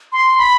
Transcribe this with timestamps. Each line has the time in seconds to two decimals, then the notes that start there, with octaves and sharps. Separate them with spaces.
0.12 C6
0.38 B5